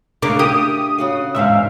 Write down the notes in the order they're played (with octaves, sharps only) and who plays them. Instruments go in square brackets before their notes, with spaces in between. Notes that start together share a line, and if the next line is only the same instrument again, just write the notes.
[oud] C#3 A#3 [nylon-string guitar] A3 D4 [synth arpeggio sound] D6
[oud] G4 [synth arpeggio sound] D#6
[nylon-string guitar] C#3 F#4 F5
[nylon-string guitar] E2 G#2 C3 [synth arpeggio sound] E5 F5